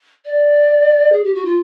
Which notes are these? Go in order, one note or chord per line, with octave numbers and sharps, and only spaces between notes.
D5
G#4
G4
F#4
F4